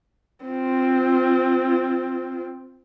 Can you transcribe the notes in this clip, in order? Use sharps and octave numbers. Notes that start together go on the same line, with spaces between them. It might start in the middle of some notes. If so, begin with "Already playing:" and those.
C4 F4